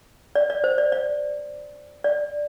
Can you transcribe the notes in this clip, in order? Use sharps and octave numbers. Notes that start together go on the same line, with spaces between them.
D5
D5
C5
D5
D5
D5